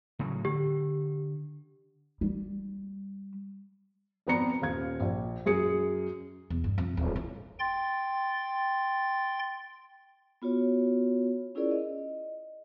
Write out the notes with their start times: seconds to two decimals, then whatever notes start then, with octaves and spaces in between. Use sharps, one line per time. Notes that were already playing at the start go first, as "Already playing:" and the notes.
0.19 A2 C#3 F#3
0.45 D3 G4
2.21 G3
4.27 G#1 F2 B3 D5 A#5 C#7
4.62 D#1 F5 G#6
5.00 A#1
5.46 F#2 G#4 C#7
6.50 E2
6.64 G2
6.78 F2
6.97 D1
7.16 E4
7.59 G5 C6 A6
10.42 B3 F4 F#4 C#5
11.55 C#4 E4 F4 G#4 A#4 D5
11.71 D#5